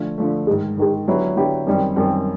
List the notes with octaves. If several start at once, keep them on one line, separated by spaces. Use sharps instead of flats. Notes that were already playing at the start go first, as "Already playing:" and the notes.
Already playing: D3 F3 A3
D3 F3 A3
G#2 D#3 G#3
G#2 D#3 G#3
D3 F#3 B3 E4 G4
D3 F#3 B3 E4 G4
F#2 D#3 G3 C4
F#2 D#3 G3 C4